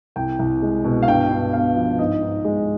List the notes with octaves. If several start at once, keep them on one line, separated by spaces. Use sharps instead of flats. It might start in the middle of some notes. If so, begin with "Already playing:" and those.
C2 G5
C2
G#3
B2
F5
G2 G5
G2
B3 F5
F3
G#2 D#5
G#2
G#3